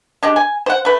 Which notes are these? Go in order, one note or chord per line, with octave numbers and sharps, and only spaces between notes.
G#3 D4 G4
G#5
C5 F#5
A3 B4